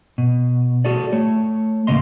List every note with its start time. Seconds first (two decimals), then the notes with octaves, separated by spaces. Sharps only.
0.18 B2
0.84 F#4 G#4 A4 D5
1.12 A3 C#5
1.87 E2 A2 C#3 A#3 D#5 C6